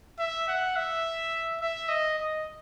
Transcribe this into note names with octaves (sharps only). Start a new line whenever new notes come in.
E5
F#5
E5
E5
D#5
D#5